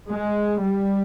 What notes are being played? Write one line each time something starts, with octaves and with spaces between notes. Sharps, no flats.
G#3
G3